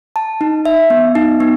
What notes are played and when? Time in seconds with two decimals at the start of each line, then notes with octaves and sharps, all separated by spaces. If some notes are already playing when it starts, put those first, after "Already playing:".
0.16 A5
0.41 D#4
0.65 E5
0.90 B3
1.15 D#4
1.40 B3